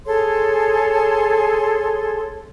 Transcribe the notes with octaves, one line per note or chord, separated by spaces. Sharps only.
G#4 A4 C#5 C6